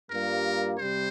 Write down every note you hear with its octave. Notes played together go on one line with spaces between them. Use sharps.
G2 G3 A#3 F4 A#4
C3 G3 C5